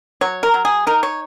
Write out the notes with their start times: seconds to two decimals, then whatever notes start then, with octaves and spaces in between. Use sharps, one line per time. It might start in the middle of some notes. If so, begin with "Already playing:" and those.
0.21 F#3 C#5
0.43 A#4
0.54 F#3
0.65 G#4
0.87 D#4 A#4
1.03 C#5